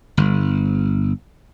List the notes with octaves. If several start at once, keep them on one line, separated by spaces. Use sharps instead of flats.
G1